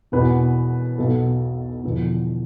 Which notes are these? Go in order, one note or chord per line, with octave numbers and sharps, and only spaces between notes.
E1 E2 B2 B4
B1 B2 A4
E1 E2 D3 F3